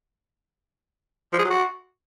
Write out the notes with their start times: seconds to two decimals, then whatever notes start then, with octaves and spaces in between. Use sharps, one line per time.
1.33 F3
1.39 G#4
1.45 F#3
1.50 F#4